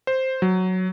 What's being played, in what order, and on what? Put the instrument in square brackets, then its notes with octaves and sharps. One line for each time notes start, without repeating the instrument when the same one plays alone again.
[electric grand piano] C5
F#3